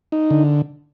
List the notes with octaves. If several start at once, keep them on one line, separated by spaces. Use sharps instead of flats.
D#4
D3